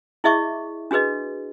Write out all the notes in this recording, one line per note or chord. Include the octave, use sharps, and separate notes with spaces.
E4 G#4 D#5 E5 C#6 D6
D4 F#4 G#4 B4 D#5